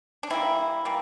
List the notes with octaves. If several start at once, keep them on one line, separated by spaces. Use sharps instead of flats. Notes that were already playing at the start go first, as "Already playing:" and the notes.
D4
E3 G3 A#3 C4 E4
E3 G3 A#3